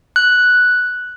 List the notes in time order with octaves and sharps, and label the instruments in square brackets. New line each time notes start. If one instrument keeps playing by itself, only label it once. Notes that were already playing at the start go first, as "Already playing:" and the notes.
[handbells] F#6